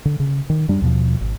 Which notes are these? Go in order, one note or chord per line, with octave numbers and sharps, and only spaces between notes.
D3
C#3
D#3
F#2 G3 D4
D#2 B2 F3
G#1